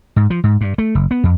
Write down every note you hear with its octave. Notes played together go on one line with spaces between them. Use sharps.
G#2
F3
G#2
G2
A3
F#1
B3
F2